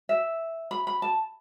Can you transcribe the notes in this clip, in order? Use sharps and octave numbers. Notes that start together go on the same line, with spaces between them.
E5
B5
B5
A5